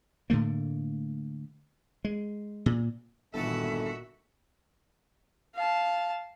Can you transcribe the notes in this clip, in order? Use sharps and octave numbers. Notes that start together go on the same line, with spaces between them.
A2 D3 A3 A#3
G#3
A#2
G1 A#2 D#3 E3 F#4 A4 E5
F5 A5